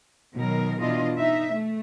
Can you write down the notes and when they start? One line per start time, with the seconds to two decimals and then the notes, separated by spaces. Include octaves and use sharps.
0.35 B2 D#3 F#3 A#4
0.80 B2 E3 D4 F4 D#5
1.18 D#4 E5
1.52 A3